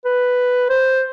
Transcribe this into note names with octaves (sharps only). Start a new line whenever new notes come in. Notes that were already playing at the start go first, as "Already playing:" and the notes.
B4
C5